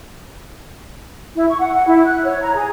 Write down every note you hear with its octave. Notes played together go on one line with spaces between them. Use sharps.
E4
C#6
F#5
F#5
E4
F#6
C#5
A#5
G#4